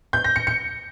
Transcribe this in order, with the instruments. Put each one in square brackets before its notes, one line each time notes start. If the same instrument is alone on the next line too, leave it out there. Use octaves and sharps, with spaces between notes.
[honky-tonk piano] G6
A#6
C#7
C#7